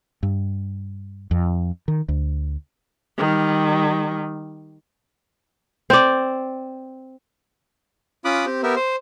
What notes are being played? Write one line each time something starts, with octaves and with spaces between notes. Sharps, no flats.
G2
F2
D#3
D2
D#3 G3
C4 D5
C#4 F4 B5 D6 D#6 F#6
C4 G4
B3 G4 A#4 E5
C5